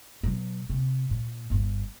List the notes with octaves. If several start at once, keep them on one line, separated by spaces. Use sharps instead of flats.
B2 F#3
C3
A#2
G1 G2